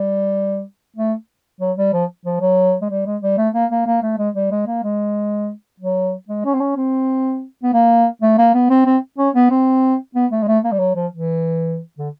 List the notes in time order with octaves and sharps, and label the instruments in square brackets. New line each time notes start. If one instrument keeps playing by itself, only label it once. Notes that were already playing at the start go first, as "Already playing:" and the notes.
Already playing: [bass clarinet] G3
A3
F#3
G3
F3
F3
F#3
G#3
G3
G#3
G3
A3
A#3
A#3
A#3
A3
G#3
G3
G#3
A#3
G#3
F#3
G#3
C#4
C4
C#4
C4
B3
A#3
A3
A#3
B3
C4
C4
C#4
B3
C4
B3
A3
G#3
A3
A#3
G3
F#3
F3
E3
D3